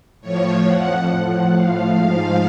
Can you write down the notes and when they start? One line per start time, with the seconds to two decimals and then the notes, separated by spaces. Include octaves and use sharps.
0.21 A2 F3 C#5
0.64 F2 F3 F#5
1.08 A2 F3 F#5
1.52 A2 F3 F5
1.96 G#2 F3 F5